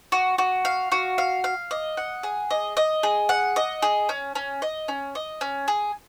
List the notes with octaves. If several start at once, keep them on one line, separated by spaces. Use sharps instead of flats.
F#4
F#4
F5
F#4
F5
F5
D#5
F#5
G#4
D#5
D#5
G#4
F#5
D#5
G#4
C#4
C#4
D#5
C#4
D#5
C#4
G#4